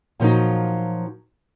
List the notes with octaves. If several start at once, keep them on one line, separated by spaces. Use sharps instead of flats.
A#2 F3 F#3 D#4